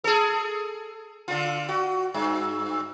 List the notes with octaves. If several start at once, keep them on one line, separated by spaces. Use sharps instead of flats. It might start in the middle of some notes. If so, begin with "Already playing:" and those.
G#4 A4
D3 F4
F#4
G2